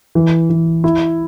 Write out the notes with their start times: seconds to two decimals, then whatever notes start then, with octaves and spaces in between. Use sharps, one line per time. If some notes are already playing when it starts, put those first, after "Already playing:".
0.15 E3
0.50 E3
0.84 E4